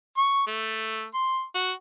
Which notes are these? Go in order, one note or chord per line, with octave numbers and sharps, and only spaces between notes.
C#6
A3
C6
F#4